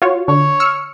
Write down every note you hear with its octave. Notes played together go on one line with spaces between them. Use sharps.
F4 F#4 C#5
D3 C#5
E6 F6 C#7